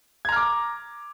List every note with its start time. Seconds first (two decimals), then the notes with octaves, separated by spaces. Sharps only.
0.25 G#6
0.29 A#5
0.32 F6
0.36 D6